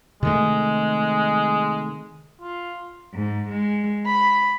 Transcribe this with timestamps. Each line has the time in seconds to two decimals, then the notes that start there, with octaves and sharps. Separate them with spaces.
0.23 C3 D#3 G#3 A3
2.42 F4
3.13 G#2
3.50 G#3
4.05 B5